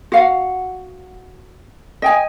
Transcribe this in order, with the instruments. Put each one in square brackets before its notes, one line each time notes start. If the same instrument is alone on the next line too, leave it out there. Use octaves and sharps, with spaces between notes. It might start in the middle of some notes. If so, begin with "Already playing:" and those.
[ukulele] F#4 F5 F#5
D#5 G5 G#5